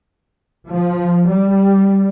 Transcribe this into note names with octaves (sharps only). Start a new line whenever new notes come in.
F3
G3